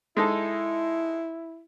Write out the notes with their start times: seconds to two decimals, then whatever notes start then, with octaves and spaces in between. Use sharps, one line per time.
0.17 G#3 D#4 E4 A4